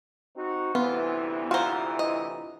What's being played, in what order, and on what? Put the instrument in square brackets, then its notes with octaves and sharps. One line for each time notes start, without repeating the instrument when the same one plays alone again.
[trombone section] C4 D#4 F#4
[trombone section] D2 C3 E3 [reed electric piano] B3 [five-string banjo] F4
[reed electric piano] F4 A#5 [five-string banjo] F#4 C5
[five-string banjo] D#5